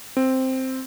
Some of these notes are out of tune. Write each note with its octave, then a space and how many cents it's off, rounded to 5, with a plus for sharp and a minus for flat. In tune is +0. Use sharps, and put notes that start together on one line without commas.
C4 +0